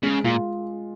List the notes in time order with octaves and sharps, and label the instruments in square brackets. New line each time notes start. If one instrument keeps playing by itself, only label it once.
[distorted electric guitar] C#3 [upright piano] G#3
[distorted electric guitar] A#2 [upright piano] F4